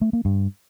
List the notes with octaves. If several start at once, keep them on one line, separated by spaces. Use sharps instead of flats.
A3
A#3
G2